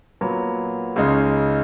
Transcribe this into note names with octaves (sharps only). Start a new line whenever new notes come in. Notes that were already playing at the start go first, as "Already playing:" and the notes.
A#2 F#3 B3
C#2 C#3 G#3 D#4